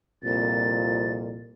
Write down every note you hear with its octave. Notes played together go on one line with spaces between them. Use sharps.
C2 F2 A#2 A6